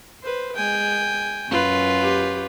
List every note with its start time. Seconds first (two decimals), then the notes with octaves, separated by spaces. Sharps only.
0.22 B4 C5
0.56 G#3 G5 G#5
1.49 F#2 F4 B4
2.03 G4